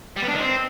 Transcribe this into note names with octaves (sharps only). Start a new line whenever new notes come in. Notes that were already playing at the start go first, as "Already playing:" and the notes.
G3
B3
D4
D#3
C4